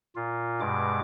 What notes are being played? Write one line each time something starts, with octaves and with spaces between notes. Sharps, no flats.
A#2 F4
G2 B2 G#3 D6